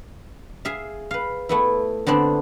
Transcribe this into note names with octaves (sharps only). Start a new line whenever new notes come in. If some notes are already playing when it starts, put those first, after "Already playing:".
G#4 E5 F5
B4 F5
A3 B3 E4
D3 B3 C4 D4